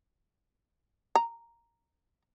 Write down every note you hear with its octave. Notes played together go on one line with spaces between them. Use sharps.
A#5